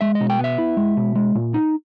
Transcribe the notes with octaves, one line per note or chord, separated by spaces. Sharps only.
G#3 E5
D#5
B2
G5
B3 E5
E4
G#3
B2
G#3
A#2
D#4